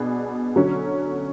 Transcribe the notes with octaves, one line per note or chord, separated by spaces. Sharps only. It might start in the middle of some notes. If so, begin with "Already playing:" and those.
Already playing: B2 B3 D4 G#4
D3 F#3 C#4